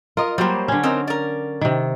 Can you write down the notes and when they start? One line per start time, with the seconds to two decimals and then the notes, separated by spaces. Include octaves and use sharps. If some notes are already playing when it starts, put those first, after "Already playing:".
0.17 F4 A#4 D#5
0.38 F#3 G3 A#3 G4 C5
0.68 D3 C#4
0.83 C4 D#4 A#4
1.07 A#4 D5
1.61 C3 D#3